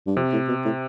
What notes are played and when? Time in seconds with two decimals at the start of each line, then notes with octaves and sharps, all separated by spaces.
0.07 G2
0.16 F2 C3
0.33 A2
0.48 B2
0.65 A2